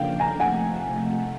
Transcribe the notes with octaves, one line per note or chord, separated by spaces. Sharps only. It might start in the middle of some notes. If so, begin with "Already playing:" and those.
Already playing: C#3 F3 A#3 D4 F5 G5
G#5 A#5
C3 F3 A3 F#5 G#5